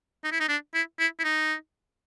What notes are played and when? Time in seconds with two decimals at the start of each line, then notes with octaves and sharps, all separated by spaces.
0.24 D#4
0.32 E4
0.40 D#4
0.49 D4
0.74 E4
0.99 E4
1.19 E4
1.24 D#4